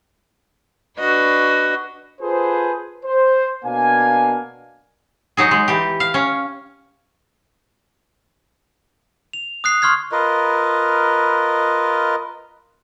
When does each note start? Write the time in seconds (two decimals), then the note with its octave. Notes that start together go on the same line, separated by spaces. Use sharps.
0.98 D4 F#4 B4 D#5
2.21 F4 G#4 A4 B4 C5
3.05 C5
3.65 B2 A#3 D4 F5 G#5
5.37 F#3 D#4 G#4
5.51 G#3
5.68 E3 G4
6.00 F5
6.14 C#4
9.33 F7
9.64 D#6 F#6 C7
9.82 C6 C#6 F6 G#6 C7
10.12 F4 A#4 B4 D#5